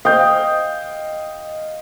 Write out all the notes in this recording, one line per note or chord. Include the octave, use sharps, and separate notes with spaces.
D#5 F5 G5 G6